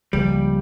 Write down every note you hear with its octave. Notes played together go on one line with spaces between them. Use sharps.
C#2 C#3 F3 G3 A#3